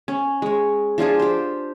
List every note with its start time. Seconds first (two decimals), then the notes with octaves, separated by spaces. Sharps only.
0.08 C#4
0.42 G#3 C#5
0.98 F3 D4 F4 G#4
1.19 G4 C5